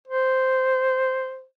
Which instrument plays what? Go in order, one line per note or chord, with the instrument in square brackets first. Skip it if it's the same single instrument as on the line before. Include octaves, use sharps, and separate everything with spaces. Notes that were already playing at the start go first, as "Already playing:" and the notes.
[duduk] C5